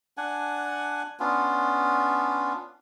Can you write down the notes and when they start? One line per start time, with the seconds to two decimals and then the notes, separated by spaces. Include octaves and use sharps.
0.17 D4 F#5 G#5
1.20 B3 C#4 D4 F4